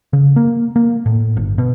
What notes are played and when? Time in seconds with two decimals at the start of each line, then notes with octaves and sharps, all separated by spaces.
0.13 C#3
0.36 A#3
0.76 A#3
1.06 A2
1.37 G1
1.58 B2